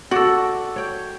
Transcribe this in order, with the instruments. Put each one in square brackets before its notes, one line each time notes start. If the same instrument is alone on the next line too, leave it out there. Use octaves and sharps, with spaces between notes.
[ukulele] F#4 [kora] A4 D5
[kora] C#5 G5